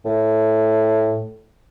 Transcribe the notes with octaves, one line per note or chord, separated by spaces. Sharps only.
A2